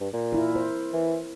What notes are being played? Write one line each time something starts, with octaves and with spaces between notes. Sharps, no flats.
G2
A#2
E4 A#4
C5
E3